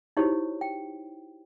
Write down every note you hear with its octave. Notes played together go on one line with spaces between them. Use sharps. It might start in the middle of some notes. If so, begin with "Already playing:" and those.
D#4 E4 F#4 G4 C5 C#5
G5